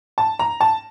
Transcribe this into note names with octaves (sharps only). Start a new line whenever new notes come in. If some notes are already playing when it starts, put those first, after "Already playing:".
A5
A#5
A5